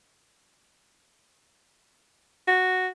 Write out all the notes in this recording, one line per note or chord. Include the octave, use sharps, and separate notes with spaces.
F#4